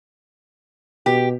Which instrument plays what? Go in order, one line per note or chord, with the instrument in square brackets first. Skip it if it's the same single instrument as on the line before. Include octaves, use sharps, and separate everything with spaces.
[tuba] B2 [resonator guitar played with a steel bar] G4